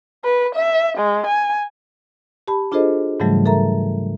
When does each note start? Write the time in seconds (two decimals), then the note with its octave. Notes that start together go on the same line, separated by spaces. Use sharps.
0.25 B4
0.55 E5
0.98 G#3
1.27 G#5
2.48 G4 A5 B5
2.72 D4 F4 G#4 A4 C5 D#5
3.20 G#2 C#3 E3 F#3 G3 A3
3.46 A4 A#4 E5 A#5